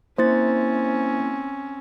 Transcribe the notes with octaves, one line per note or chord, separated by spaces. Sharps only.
A#3 C4 C#4 E4 C5 A6